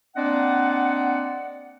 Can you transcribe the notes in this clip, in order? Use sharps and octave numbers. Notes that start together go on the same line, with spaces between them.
A#3 C4 D4 D5 D#5 F#5